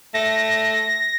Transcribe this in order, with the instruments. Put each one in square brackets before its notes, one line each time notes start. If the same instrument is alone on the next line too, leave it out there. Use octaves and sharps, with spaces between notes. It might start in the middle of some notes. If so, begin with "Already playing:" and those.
[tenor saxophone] A3 [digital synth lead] A#6